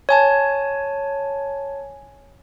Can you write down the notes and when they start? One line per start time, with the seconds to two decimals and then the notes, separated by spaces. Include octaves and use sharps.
0.09 C#5 G#5 A5